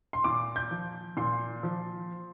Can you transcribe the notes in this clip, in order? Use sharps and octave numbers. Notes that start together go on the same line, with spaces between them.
C6
A#2 D6
G6
F3
A#2 C6
F3